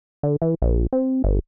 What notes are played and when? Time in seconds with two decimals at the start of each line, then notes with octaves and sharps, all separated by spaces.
0.23 D3
0.42 E3
0.62 A#1
0.93 C4
1.24 G1